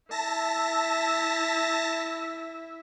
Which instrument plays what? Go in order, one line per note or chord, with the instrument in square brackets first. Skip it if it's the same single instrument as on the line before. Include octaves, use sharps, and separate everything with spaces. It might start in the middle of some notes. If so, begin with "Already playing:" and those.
[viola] E4 E5 [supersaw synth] A5 A#6